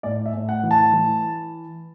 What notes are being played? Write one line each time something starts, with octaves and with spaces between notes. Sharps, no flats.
A2 D5
E5
A2
F#5
E3
A5
E3